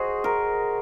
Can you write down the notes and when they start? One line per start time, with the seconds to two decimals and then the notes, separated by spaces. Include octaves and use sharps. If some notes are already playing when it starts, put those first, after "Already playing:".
Already playing: F#4 G#4 C5 D#5
0.24 A#4